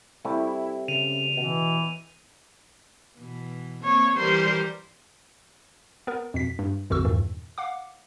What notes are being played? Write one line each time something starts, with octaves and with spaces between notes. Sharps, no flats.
C3 G3 A3 E4
C#3 D#7 F7
B2 E3
B2 E3
A#3 C4 C#5
E3 G3 A#4 C5
B3 A#4
F2 B2 B6
G2
A#1 F2 D3 F#4 C#6 E6
E2 G2 A#2 D#3
F5 F#5 D6